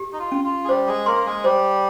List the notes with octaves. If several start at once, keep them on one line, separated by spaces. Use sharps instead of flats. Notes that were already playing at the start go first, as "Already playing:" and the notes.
Already playing: G4
D#4
F4
C#4
F4
G#4
G3 G4 C5
G#3 G#4
A#3 A#4 C6
G#3 G#4
G3 G4 C5